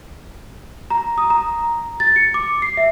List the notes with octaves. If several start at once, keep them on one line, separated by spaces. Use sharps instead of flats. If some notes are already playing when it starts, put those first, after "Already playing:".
A#5
D#6
A#5
A6
C#7
D6
C7
E5